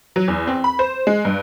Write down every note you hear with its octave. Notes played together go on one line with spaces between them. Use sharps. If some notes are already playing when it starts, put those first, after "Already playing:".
F#3
E2
C4
B5
C5
G#3
G2